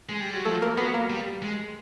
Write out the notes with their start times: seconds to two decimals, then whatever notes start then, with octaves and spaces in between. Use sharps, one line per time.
0.09 G#3
0.21 G3
0.33 F#3
0.45 F3 A3 A4
0.62 A#3 A#4
0.77 F#3 B3 B4
0.94 A#3 A#4
1.10 G3
1.42 G#3